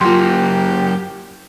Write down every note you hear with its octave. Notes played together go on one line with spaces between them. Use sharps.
F#2 A#3 F4 G4 C6